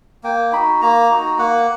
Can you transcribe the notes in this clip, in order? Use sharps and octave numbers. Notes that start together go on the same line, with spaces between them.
A#3 G5
D#4 F#4 B5
A#3 A#5
D#4 F#4
A#3 F#5